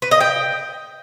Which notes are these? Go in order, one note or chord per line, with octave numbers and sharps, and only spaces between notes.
B4
D#5
G5